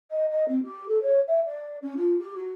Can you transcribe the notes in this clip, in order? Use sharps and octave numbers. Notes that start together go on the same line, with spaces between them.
D#5
D#5
C4
G4
A4
C#5
E5
D5
C#4
F4
G4
F#4